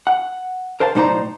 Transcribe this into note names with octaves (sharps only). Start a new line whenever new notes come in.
F#5
A#4 C5 F5 A5
B1 A2 D#4 C5 D5 A#5